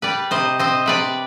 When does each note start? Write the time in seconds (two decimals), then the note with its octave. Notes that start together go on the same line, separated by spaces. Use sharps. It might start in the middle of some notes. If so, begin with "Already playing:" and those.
0.02 G3 B4 D5
0.31 C3 C5 D#5
0.59 C4 C5 D#5
0.86 C3 B4 D5